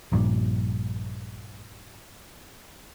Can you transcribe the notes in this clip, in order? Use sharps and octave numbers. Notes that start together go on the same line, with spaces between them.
A#1 G2 A#2